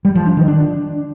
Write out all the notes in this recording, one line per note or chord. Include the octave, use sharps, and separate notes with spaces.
G3
F3
D4
D#3
D4